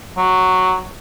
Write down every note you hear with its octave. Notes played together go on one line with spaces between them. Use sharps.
F#3